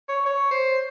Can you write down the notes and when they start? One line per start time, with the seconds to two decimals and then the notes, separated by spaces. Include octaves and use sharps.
0.09 C#5
0.26 C#5
0.51 C5